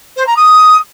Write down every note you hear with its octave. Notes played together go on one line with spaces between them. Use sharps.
C5
A#5
D#6